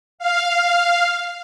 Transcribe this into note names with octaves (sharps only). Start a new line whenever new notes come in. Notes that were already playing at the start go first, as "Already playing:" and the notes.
F5